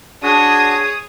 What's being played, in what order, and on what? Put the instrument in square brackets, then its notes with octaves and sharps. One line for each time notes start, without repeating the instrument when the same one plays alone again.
[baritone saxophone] D4 [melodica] F#4 [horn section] G#4 C#5 [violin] D#6